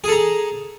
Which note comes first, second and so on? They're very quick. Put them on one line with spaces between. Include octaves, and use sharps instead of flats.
G#4 A4 A#5